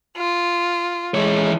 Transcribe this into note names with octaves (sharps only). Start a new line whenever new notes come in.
F4
E3 G#3 C#5